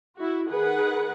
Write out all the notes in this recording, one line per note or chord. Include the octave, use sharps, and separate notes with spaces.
E4 F#4
D#3 G#4 B4 F#5